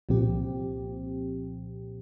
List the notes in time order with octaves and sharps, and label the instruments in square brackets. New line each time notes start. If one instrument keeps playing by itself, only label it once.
[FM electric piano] C2 A#2 F3 C4 G4